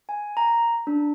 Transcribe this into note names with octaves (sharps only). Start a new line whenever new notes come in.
G#5
A#5
D4